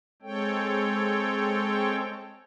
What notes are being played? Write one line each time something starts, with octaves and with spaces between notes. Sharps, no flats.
G#3 C4 A4 C#5 G5